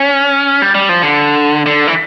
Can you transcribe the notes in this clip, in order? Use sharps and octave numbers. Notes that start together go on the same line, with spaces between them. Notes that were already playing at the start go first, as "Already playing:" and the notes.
Already playing: C#4
G3
G3
F3
D3
D3
E3